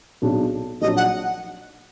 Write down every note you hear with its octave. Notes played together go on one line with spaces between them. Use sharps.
B1 B2 F#3 D4 G#4
A#1 A#2 F#3 D4 D#5
F#5